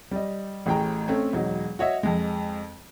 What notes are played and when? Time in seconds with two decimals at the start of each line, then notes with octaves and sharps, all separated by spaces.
0.11 G3 D#5
0.66 A1 A2 G#4 G5 A#5
1.08 A3 C4 C#4
1.33 E1 F#3 D#4
1.79 F#4 C#5 D#5 E5
2.03 F2 G#3